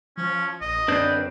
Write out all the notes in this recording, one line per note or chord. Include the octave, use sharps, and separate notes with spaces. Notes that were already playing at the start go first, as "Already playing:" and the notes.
F3 C#4
A#1 D#5
F#2 D3 C4 D4 B4 D5 G6